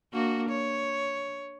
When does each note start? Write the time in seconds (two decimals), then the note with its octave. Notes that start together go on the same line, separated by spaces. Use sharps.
0.13 A#3 D4 F#4
0.49 C#5